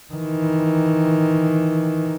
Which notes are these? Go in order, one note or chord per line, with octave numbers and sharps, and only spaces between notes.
D#3 E3